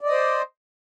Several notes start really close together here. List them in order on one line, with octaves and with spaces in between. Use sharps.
D5 D#5 C5